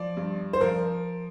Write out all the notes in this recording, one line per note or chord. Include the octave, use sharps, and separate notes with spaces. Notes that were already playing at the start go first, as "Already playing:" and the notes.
Already playing: F3 D5
G2
C5
F3 A#4